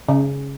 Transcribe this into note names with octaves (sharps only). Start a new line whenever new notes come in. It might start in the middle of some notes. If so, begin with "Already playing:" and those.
C#3